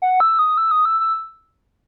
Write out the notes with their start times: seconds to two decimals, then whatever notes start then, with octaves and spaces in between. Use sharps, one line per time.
0.02 F#5
0.20 E6
0.39 D#6
0.58 E6
0.71 D#6
0.85 E6
1.00 E6